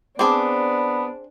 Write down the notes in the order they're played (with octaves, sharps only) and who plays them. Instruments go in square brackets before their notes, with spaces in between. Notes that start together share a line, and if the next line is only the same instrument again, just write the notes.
[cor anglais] B3 [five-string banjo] C4 G#4 [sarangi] D4 [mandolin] A5 D6